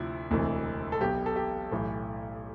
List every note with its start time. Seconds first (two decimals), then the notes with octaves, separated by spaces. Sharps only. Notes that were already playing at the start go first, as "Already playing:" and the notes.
Already playing: D2 C3 F3 E4
0.30 E1 D2 C3 E3
0.92 A4
1.01 B1 B2 G4
1.26 A4
1.36 G4
1.72 B1 A2 E3